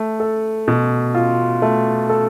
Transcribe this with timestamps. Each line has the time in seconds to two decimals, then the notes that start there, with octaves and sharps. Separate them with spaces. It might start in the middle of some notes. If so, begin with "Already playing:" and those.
Already playing: A3
0.20 A4
0.68 B2
1.15 F4
1.62 A3
2.09 A4